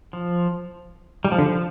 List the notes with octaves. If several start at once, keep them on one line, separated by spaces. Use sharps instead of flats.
F3
G3
F3
D3
F3